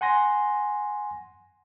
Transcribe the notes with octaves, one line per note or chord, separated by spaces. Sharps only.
F#5 G#5 C6 A#6